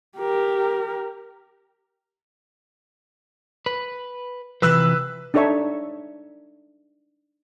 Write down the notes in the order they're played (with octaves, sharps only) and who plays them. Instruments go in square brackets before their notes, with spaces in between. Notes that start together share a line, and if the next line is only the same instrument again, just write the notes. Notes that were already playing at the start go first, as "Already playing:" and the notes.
[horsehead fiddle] G4 A#4
[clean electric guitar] B4
[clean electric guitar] C3 E3 F3 [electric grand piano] B4 E6 F#6
[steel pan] D4 D#4 A4 C#5 E5 C#6